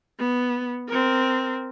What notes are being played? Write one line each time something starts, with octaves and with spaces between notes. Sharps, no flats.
B3
C4 A#4